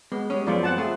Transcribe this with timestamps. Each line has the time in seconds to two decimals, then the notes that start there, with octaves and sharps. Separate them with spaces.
0.12 G#3 B3
0.30 G3 G#3 C#4
0.47 F#2 F3 G#3 B3 F4 D5
0.63 C4 F#5 A5
0.78 A3 G#4